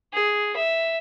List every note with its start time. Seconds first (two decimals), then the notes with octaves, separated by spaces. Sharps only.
0.13 G#4
0.56 E5